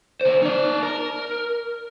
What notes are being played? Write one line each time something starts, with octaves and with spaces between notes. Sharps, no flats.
D3 C5
D#4 D5
A#4